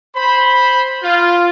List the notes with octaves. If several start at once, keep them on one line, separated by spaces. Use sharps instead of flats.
C5 B5
F4